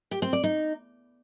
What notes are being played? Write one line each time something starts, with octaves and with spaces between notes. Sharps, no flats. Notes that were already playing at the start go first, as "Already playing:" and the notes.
G4
C4
D5
D#4